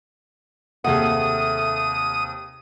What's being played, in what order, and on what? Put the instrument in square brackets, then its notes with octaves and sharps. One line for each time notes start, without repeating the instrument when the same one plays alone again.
[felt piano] D#2 C3 [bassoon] A3 [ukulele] G#4 F#5 [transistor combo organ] D#6